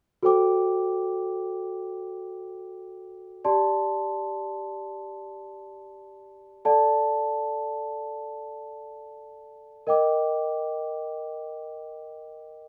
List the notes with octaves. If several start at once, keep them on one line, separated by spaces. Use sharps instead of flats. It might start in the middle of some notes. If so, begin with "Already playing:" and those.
F#4 A4 C5 G5 D6
G4 D5 A5 C6
A4 D5 F#5 A5
A#4 D#5 G5 D6